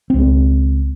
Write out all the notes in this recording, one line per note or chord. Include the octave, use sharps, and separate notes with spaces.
C#2 C4